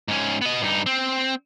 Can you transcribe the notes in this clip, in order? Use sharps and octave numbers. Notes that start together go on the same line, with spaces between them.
G#2 C#4
B3 D#5
G2 D#4
C4